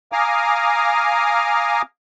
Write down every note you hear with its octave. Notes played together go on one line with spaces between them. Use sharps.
F5 G#5 A#5 D6 D#6 F6